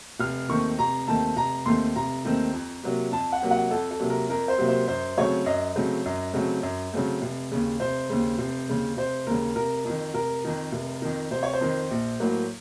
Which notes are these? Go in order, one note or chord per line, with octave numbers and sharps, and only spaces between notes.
F1 F6
D#2 D#3 A3 C4 C#6
F1 A#5
D#2 D#3 A3 C4 A5
F1 A#5
D#2 D#3 A3 C4 C6
F1 A#5
D#2 D#3 A3 C4
F2
C3 F#3 A#3
F2 A5
F#5
C3 F#3 A#3
F#5
F2 A4
A4
C3 F#3 A#3
A#4
F2 A#4
C5
C3 F#3 A#3
C5
F#2 C5
C#3 F#3 A3 C4 C#5
F#2 D#5
C#3 F#3 A3 C4
F#2
C#3 F#3 A3 C4
F#2
C#3 F#3 A3 C4
F1
D#2 C#3
F1 C5
D#2 C#3
F1
D#2 C#3
F1 C5
D#2 C#3 A#4
F1 A#4
F2 D#3
F1 A#4
F2 D#3
F1
F2 D#3
F1 C5
C#5
C5
F2 D#3
A#1
A2 F#3 A#3